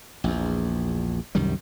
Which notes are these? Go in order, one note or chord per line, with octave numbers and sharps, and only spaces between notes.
A#1 E2
C2 F#2 D#3 G3